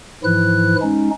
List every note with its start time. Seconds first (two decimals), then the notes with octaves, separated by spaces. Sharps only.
0.24 G#2 E3 F3 E4 F#6
0.82 G#3 C#4 D#4